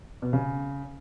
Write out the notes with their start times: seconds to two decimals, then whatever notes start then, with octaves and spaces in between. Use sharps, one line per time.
0.22 B2
0.33 C#3